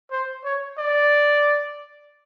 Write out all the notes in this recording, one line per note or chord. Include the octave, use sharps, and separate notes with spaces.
C5
C#5
D5